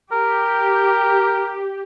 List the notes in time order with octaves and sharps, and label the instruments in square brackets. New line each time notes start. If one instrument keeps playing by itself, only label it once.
[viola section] G4 [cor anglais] A#4